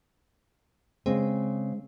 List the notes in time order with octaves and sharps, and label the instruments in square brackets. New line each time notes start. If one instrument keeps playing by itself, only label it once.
[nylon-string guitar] C#3 C4 [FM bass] G#3